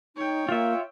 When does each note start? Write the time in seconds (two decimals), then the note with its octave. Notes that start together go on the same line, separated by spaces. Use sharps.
0.16 D#4 C#5 G5
0.49 A#3 F4 E5